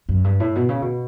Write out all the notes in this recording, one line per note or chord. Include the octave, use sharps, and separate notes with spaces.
F#2
G2
A2
B2
C#3
B2